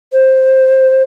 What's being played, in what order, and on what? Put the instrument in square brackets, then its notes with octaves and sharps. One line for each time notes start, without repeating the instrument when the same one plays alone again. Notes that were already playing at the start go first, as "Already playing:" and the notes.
[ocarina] C5